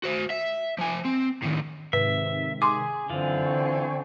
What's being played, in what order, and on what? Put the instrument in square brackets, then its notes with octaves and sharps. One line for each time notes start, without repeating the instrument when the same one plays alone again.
[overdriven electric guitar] F#4 C5
E5
F3 G#5
C4
A2 D#3
[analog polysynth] G#2 C3 D#3 [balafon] B4 [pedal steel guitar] E5
[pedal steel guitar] G#4 [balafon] C6 D6
[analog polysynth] F#2 [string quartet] D3 C4 [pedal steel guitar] E3 F4
[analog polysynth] G5 G#5 C#6